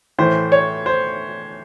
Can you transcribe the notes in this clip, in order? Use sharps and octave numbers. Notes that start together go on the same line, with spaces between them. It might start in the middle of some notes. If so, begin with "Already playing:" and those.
A2 E3 C5
C#5
C5